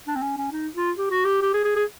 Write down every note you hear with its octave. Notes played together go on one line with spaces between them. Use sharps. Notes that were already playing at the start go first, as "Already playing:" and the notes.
D4
C4
C#4
C#4
D#4
F4
G4
F#4
G4
G4
G#4
G#4
G#4